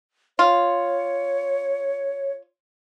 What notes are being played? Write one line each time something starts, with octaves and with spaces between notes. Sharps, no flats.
F4 C#5